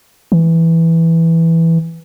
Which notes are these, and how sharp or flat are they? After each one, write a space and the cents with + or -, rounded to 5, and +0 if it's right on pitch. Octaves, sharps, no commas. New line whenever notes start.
E3 +0